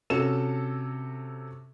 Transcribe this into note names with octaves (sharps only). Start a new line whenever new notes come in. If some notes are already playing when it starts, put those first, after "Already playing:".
C3 C#4 F#4 A4 A5 E7